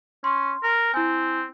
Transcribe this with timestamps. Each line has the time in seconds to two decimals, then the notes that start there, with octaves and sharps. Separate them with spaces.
0.24 C#4 C6
0.63 A#4
0.94 C4 E4 G#5